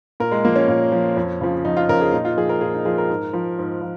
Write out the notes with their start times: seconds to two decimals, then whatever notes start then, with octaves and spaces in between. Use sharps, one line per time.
0.20 A#2 A#4
0.32 G#3
0.45 F3 A#3
0.56 C#4
0.68 A#2
0.92 F3
1.16 F2
1.41 C#3 F3
1.64 F2 D#4
1.77 F4
1.89 C#3 F3 A#4
2.01 G#4
2.12 A#2 D#4
2.25 F4
2.37 F3 G#4
2.49 A#4
2.61 A#2 G#4
2.74 D#4
2.85 F3 G#4
2.98 A#4
3.10 G#2
3.33 F3
3.58 G#2
3.82 F3